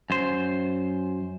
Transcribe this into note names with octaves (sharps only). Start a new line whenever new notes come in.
F#2 C5